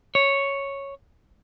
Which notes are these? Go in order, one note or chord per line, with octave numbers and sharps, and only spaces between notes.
C#5